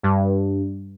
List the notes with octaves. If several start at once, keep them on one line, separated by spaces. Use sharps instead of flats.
G2